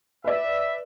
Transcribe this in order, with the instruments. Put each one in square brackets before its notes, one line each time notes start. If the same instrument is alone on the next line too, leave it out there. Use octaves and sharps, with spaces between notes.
[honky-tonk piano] B4 D5 [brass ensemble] E5